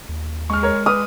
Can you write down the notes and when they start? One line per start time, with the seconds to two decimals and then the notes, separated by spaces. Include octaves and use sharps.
0.09 D#2
0.50 G#3 C#6 F6
0.63 A#4 C#5
0.86 B4 D#6 F6